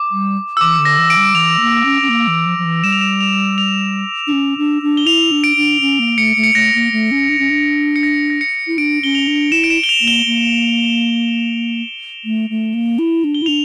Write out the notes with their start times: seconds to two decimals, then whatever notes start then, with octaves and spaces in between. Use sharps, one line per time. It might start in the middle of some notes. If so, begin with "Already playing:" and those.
Already playing: D6
0.11 G3
0.57 E6
0.61 E3 D6
0.79 D3
0.85 A#6
0.98 E3
1.10 D7
1.17 G3
1.35 E3 F7
1.60 A#3
1.85 C#4
2.02 C#4
2.09 A#3
2.28 E3
2.46 F3
2.58 F3
2.64 E3
2.84 G3 E7
2.92 F7
3.01 E7
3.20 F7
3.58 F7
4.27 D4
4.32 C#4
4.58 D4
4.82 D4
4.97 G7
5.06 E4 F7
5.31 D4
5.44 D7
5.57 D4
5.81 C#4
5.99 A#3
6.17 A3 C#7
6.36 A3
6.44 C#7
6.55 A3 A#6
6.74 A#3
6.92 A3
7.11 C#4
7.29 D4
7.39 C#4
7.50 D4
7.96 C#7
8.03 A#6
8.30 A#6
8.41 C#7
8.67 E4
8.78 D4 D7
9.03 C#4 G7
9.15 F7
9.27 D4
9.52 E4 E7
9.64 D7
9.70 E7
9.84 G7
9.89 F7
10.01 A#3
10.08 G7
10.26 A#3
12.25 A3
12.50 A3
12.74 A#3
12.99 E4
13.24 D4
13.34 G7
13.42 E4
13.46 D4 F7